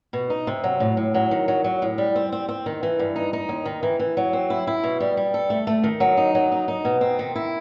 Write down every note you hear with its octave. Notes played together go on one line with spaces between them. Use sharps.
B2
D#4
C3
F#3
A2
A2
F#3
D#3
F#3
F#3
A2
G3
C4
C4
C4
D#3
E3
G2
D#4
D#4
D#2
D#3
E3
E3
F#3
C4
E4
E4
B2
G3
G3
A4
A3
A3
D#3
F#3
D#4
F#3
D#4
D#4
B2
C4
D#3
E4